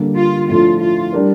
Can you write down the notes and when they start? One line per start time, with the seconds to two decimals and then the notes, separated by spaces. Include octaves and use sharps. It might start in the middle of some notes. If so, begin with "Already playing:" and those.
Already playing: D3 G3 A#3
0.16 F4
0.49 A2 F3 A3 D4 F4
0.81 F4
1.13 G3 D4 G4 A#4